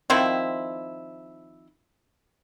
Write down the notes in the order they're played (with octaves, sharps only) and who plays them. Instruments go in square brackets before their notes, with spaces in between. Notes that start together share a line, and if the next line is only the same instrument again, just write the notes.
[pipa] D#3 F3 C4 E4